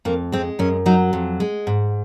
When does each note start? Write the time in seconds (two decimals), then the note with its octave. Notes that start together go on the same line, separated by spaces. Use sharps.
0.05 F2 A#3
0.32 G#3 C4
0.59 F#2 C#4
0.86 F#3 D#4
1.13 F2
1.40 G#3
1.67 G#2